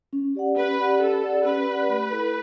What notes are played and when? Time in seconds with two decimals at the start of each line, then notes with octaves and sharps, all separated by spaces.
0.13 C#4
0.35 G4 D5 F#5
0.56 C#4 B4
0.79 G4 D5 F#5
1.01 C#4 A4
1.23 G4 D5 F#5
1.45 C#4 B4
1.67 G4 D5 F#5
1.89 A3
2.11 E4 A4